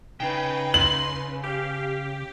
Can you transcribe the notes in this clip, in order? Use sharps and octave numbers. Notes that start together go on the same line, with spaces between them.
C#3 D#4 B4 G5
C6 F#7
G4 F5